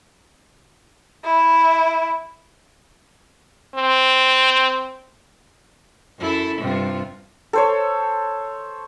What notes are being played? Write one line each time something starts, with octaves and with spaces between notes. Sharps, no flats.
E4
C4
F#2 E4 A4
G2 C3 F4
A4 C5 C#5